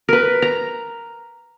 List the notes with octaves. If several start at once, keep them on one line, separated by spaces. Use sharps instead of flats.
A#4 B4
A#5